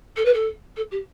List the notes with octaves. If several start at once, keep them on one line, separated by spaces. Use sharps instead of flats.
A4
B4
A4
A4
G4